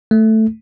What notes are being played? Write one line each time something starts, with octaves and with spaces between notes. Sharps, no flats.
A3